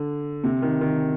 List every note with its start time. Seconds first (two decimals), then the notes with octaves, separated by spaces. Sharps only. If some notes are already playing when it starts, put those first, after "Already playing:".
Already playing: D3
0.44 C3
0.62 D#3
0.81 D#3